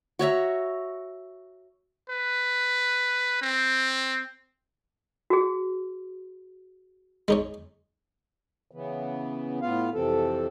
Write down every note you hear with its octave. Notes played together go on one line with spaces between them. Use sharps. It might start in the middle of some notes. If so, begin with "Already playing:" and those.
F#4 C#5 E5 A#5
B4
C4
F#4 G#4
G#3 D#4 C#5
C#3 E3 B3
A2 B3 F4 F5
F2 C3 E3 C4 A4